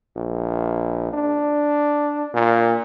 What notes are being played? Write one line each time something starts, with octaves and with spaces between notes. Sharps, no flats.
A#1
D4
A#2